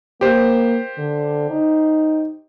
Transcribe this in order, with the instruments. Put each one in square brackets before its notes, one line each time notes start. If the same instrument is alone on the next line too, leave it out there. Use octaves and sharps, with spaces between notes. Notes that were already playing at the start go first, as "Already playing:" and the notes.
[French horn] A#3 [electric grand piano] G4 C5
[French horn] D3
D#4